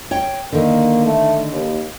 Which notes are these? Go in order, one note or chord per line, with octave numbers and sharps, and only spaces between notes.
C#5 G5
D3 D#3 A#3
A3
D#2